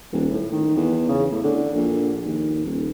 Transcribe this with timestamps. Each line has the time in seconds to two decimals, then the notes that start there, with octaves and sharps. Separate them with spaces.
0.13 D#1
0.30 A2
0.52 D#3
0.76 E2
1.09 C#3
1.31 A2
1.44 D3
1.75 A#1
2.25 D#2
2.65 D#1